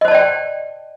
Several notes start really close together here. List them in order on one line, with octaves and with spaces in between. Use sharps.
D#5 C5 A5 D5 G5